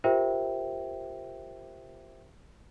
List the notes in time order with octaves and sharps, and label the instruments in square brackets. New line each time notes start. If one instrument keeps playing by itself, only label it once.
[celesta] F4 G4 A#4 C5 E5 G5